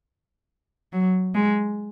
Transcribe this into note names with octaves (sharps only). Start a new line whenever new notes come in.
F#3
G#3